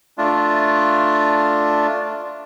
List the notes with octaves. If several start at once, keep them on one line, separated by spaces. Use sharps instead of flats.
A3 D4 F4